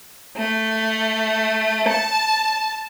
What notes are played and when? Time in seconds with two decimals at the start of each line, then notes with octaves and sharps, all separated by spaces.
0.36 A3
1.87 A5